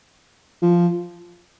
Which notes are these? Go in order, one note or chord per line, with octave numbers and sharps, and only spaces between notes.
F3